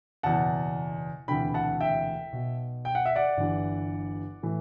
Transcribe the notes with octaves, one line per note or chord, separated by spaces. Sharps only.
F#1 E2 B2 F#5 A5
E1 D2 C3 E3 G5 B5
F#5 A5
E5 G5
B1 B2
G5
F#5
E5
D5 F#5
G1 G2 E3
A2 E3